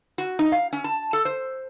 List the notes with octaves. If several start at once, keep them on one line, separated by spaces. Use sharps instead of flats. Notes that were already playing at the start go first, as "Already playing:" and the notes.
F#4
D#4
F5
C#4
A5
A4
C5